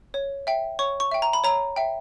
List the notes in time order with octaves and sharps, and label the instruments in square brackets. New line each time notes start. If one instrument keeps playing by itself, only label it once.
[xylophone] C#5
E5 G5
C#5 C#6
C#6
E5 G5
A#5
B5
C#5 A#5
E5 G5